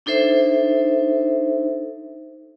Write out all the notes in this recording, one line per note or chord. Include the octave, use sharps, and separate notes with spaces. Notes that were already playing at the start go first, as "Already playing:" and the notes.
D4 D#4 A4 C5 E5